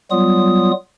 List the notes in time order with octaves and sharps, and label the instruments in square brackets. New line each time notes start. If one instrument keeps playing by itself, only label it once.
[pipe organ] F#3 G3 B3 F4 D#6